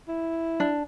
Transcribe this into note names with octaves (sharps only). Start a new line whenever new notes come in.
E4
D4